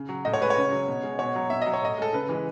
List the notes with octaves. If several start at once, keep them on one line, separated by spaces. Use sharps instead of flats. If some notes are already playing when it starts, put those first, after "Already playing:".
Already playing: C#3
F#3
A2 D#5
C#5
G#3 B4
C#5
C#3
F#3
B2
G#3
B2 C#5
F#3
B2 E5
F#3 D#5
C#5
A2 D#5
G#3 A4
C#3 B4
E3 G#3